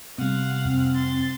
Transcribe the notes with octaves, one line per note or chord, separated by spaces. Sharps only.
C3 G3 B3 F5 F#5
F2 C4
C6 A6